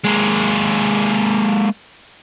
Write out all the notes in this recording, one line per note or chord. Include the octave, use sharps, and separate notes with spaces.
G#3 A#3